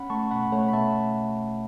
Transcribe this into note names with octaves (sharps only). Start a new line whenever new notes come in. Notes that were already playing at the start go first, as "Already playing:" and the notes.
Already playing: C#4 F#5 B5
A3 A5 C#6
B2 F#5 B5
A3 C#5 F#5
B5
B2 E5 A5